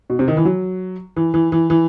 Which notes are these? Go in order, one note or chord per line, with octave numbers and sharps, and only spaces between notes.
B2
C3
D#3
E3
F#3
E3
E3
E3
E3